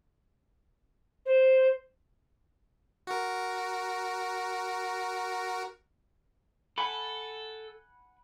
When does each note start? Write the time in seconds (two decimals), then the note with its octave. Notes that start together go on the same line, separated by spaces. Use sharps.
1.26 C5
3.07 F#4 A#4
6.78 A4 F#5 G#5 B5